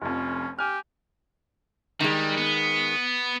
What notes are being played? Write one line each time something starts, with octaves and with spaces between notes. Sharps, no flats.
F1 F2 C#4
G4 G#5 F6
D#3 G3 G#3
B3